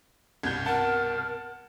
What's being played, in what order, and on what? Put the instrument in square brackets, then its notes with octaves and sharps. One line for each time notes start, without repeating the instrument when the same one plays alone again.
[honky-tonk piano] C2 G2 B2 [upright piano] G6 G#6
[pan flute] A#4 [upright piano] F#5 A5